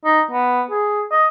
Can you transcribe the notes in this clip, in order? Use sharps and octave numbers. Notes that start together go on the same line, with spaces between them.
D#4
B3
G#4
D#5